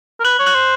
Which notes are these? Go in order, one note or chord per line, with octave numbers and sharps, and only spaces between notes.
A#4
B4 F#6 F#7
C#5
F#6 F#7
C5